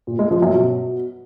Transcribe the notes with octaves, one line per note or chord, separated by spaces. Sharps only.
A#2
G#3
F3
F#2
B2